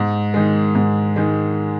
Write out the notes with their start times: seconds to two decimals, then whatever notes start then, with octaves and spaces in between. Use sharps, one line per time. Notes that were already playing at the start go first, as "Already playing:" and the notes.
Already playing: G#2
0.34 D#3 G#3
0.75 G#2
1.16 D#3 G#3